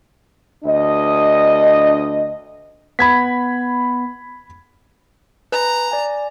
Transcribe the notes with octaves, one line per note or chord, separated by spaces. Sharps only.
D2 D4 D#5
B3 B5 G#6 B6
B4 G#5 A#5
D5 G#5